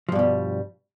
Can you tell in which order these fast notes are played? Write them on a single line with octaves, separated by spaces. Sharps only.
F3 G2 B2 G3